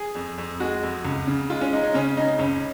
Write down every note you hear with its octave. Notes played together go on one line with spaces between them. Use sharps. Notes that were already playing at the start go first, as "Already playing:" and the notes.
Already playing: G#4
F2
F2
G#3 F#4
F2
C#2
C#3
G#3 F4
C#4
G#3 D#4
D#4
C#3 C#4
C#3 D#4
C#2 C#4